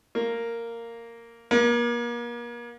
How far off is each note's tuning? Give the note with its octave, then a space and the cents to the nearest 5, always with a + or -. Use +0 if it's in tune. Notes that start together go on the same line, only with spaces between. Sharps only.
A#3 -10
A#3 +35